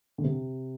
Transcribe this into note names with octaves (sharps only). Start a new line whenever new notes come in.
D3
C3